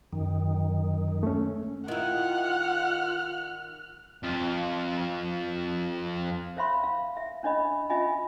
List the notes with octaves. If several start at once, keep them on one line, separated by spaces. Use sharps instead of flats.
F#2 D#3
A3 C#4
D#3 E4 F4 F#5 F6 F#6
F2 F4
C5 C#5 E5 F5 B5 C6
F5
E5
C#4 D4 C#5 D#5 B5
C#4 F4 D#5 E5 G#5 B5